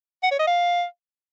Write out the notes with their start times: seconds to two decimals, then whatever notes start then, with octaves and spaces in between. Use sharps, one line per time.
0.23 F#5
0.31 C#5
0.39 D#5
0.47 F5